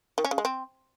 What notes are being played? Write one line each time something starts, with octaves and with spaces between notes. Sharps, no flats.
D#3
C#4
C#3
G#3
C4